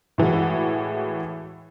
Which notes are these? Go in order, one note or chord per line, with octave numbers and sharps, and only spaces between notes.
A2 E3 G#3 F#4